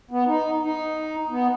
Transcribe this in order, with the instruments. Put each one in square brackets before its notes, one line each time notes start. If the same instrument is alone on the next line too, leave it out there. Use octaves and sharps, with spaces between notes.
[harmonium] B3
D#4
D#4
B3